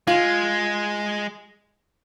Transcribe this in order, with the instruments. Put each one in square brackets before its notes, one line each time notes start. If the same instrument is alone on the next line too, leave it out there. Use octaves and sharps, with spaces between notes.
[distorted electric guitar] G#3 [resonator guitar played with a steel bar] F4